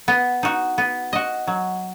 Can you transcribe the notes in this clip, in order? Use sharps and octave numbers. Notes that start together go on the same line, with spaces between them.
B3
D#4 F#4
B3
F#4 D#5
F#3